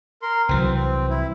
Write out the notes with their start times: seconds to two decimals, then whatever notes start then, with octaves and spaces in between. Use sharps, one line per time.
0.22 A#4 C6
0.49 C2 E3 F#3 C4
0.73 C4
1.10 E4